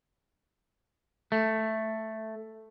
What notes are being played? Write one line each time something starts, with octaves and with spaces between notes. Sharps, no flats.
A3